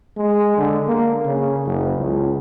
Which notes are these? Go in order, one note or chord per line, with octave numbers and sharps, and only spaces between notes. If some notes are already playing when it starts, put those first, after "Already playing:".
G#3
D3
A#3
C#3
F#1
C#2